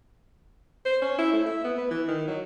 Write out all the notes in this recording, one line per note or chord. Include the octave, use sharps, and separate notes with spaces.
C5
C#4
E4
A3
E5
B3
B4
E3
D#3
F#3